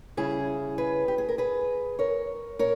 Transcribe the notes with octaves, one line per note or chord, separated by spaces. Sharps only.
C#3 G3 C#4 E4 G#4
G#4 B4
G4
G#4
A#4
G#4 B4
A#4 C#5
A#2 A#4 C#5